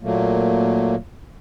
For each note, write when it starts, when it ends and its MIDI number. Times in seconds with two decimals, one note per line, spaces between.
0.03 0.95 46
0.03 0.95 54
0.03 0.95 57
0.03 0.95 58